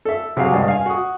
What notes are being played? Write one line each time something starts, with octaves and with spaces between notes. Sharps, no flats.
A4 E5
C3 F#3 G#4 F5
C#2 G2 D#5
F5 G#5
F#4 D#6